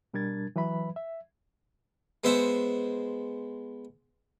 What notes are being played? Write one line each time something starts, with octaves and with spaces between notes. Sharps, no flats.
B2 G3 D4 A#4 G#6 A6
E3 F#3 B4 E5 B5
E5
G#3 B3 C5 E5 F#5